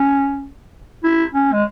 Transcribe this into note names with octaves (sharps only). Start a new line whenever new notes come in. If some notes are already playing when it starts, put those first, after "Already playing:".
Already playing: C#4
E4
C#4
G#3